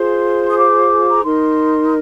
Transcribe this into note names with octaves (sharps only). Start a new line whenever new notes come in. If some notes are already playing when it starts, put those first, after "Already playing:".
Already playing: F4 G#4 C5 C6
D#6
D6
A#5
D#4 A#4 C6